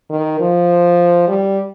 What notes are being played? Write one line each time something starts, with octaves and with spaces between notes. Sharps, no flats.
D#3
F3
G3